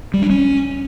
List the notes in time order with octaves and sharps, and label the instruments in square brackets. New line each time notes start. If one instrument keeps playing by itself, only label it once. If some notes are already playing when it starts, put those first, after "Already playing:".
[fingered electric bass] G3
D4
C#4